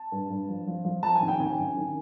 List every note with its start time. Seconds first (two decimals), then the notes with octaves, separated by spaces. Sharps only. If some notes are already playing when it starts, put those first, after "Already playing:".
Already playing: A5
0.12 G2
0.30 G2
0.49 F3
0.67 F3
0.84 F3
1.03 F3 A5
1.15 G#5
1.22 D#2
1.28 G5
1.40 D#2 G#5
1.58 F#2
1.76 D#3